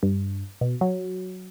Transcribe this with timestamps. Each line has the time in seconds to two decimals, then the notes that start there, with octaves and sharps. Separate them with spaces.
0.03 G2
0.61 B2
0.81 F#3